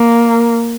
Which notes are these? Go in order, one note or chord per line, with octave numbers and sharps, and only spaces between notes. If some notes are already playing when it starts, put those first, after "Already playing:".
Already playing: A#3